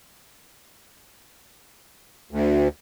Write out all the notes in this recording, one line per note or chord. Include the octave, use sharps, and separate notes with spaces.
D2